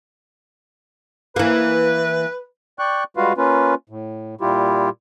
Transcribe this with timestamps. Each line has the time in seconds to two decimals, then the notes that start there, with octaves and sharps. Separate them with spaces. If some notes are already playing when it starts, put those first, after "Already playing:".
1.36 E3 A#3 B4
2.79 D5 G5 C#6 F#6
3.17 G3 G#3 F4 F#4 B4 F5
3.37 A#3 C#4 F4 B4
3.89 A2
4.41 A#2 G3 E4 F4 G4